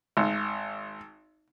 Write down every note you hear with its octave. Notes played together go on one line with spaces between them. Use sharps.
G#1